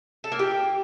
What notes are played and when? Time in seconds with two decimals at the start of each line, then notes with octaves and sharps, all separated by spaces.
0.24 A4
0.32 A#3
0.39 G4